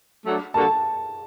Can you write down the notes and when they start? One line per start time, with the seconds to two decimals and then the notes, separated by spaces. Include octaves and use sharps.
0.24 F#3 A3 D4
0.54 D3 G3 A#3 F#4 A4 A5